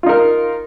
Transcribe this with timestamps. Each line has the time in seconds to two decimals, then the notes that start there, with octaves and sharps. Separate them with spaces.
0.03 F4
0.06 D#4
0.09 A#4